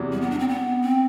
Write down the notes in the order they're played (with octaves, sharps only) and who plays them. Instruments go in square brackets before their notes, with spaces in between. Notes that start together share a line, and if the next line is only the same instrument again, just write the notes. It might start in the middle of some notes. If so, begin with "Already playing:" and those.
Already playing: [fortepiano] E2 C3 F#3
[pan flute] G3
B3
D4
C4
B3
C4